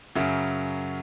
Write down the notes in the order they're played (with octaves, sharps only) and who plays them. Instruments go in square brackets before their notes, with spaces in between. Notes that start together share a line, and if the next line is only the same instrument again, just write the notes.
[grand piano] F#2 C#3 F#3 E5